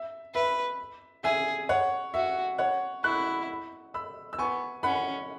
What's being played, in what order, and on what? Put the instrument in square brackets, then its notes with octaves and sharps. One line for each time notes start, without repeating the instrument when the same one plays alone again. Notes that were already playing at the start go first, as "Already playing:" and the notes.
Already playing: [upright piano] E5
[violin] B4 [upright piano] E5
[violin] G#4 [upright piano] E5 G#5
[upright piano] C#5 F#5
[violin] F#4 [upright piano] E5
[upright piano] C#5 F#5
[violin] E4 [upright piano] C#6 F#6
[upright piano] B5 E6
E6
[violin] B3 [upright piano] G#5 C#6
[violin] C#4 [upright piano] F#5 B5